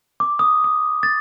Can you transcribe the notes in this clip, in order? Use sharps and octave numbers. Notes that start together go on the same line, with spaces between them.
D6
D#6
D#6
A6